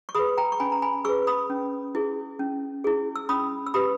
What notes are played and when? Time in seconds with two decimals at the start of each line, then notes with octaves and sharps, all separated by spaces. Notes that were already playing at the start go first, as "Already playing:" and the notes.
0.09 C#6
0.15 G#4 B4 B5 D#6
0.37 G5 A#5
0.52 C#6
0.60 C#4 G#5 B5
0.72 A#5
0.82 G#5 B5
1.05 G#4 B4 C#6 E6
1.27 B5 D#6
1.50 C#4
1.95 E4 G#4
2.39 C#4
2.84 E4 G#4
3.16 E6
3.29 C#4 B5 D#6
3.67 E6
3.74 G4 B4 B5 D#6